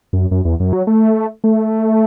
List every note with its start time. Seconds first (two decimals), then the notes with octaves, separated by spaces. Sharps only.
0.13 F#2
0.31 F#2
0.45 E2
0.60 F#2
0.73 F#3
0.87 A3
1.44 A3